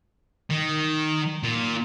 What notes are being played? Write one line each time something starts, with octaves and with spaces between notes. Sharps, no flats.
D#3
A#2